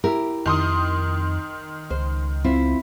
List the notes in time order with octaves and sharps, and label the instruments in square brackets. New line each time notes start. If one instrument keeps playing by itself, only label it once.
[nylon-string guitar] E4 G4 A#4
[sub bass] F2 [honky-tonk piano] D#3 C6 D#6
[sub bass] C#2 [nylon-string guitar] C5
[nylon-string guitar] C4 E4 F4